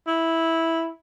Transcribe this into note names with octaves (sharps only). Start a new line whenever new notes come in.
E4